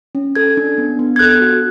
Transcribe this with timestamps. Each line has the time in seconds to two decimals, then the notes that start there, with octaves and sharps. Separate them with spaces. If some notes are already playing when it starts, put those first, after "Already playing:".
0.15 C#4
0.35 A4 G#6
0.57 D4
0.78 B3
0.99 B3
1.16 G#6
1.19 A4 F#6
1.41 F#4